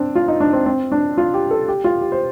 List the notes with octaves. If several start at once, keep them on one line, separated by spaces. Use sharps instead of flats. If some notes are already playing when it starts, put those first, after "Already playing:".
Already playing: C4 D4
F4
D#4
D4
C4
C4
D4
F4
G4
A4
G4
F4
G4
C5